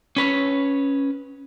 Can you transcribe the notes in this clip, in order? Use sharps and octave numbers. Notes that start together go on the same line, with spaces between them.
C#4 B4 C#5